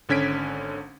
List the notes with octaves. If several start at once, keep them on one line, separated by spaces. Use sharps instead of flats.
G#1 D3 C#4 G#6 B6 D7